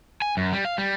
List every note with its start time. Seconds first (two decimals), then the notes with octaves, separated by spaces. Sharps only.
0.22 G#5
0.37 F#2
0.53 G3
0.65 F5
0.78 G3